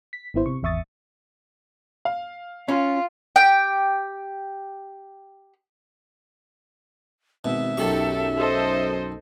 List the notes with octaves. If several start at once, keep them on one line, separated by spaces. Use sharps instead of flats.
B6
G#1 B3 E4 C5
C3 C#6
G#1 E2 E5 C#6 D#6 A6
F5
C#4 F4
G4 G5
G#1 B2 E5
B1 F#2 D#3 G4 A4 C#6
A4 C5 D#5